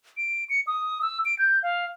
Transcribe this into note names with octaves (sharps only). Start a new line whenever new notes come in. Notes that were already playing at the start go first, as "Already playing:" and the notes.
D7
C#7
D#6
E6
D7
G6
F5